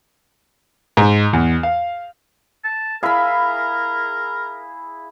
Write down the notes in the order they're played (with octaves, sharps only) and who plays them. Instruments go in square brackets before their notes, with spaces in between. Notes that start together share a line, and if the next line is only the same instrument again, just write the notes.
[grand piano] G#2
E2
F5
[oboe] A5
[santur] E4 G#4 [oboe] A#4 [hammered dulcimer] F5 B5